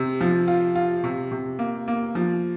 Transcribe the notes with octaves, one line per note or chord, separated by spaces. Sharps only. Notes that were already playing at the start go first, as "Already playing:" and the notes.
Already playing: C3
F3
F4
F4
C3
C3
A#3
A#3
F3